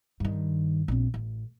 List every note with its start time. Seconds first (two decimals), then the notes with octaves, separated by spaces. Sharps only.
0.20 G2 D#3
0.88 A#1 C4
1.14 A1